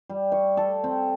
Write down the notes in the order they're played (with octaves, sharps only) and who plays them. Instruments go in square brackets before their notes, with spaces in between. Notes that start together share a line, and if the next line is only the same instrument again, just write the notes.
[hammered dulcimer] G3
C#6
A4
C4